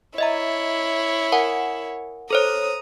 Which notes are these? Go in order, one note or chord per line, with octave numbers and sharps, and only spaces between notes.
E4 C#5 D#5 E5 A#5
A#4 F#5 G#5
A4 C5 C#5 A#5 D#6